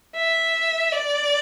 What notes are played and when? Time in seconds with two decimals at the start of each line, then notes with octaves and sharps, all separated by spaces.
0.16 E5
0.92 D5